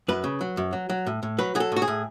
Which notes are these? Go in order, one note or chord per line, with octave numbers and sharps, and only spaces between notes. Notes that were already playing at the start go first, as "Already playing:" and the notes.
F#2 B4
C#3
F#3
F#2
F#3
F#3
A2
A2
F#3 B4
F#3 G#4
A4
A2 F#4
G#4
A2